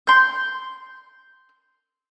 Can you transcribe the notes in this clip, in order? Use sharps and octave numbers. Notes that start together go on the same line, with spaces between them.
C6 G6